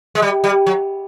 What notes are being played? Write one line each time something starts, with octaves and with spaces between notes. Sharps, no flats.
G#3
G3
G3
F#3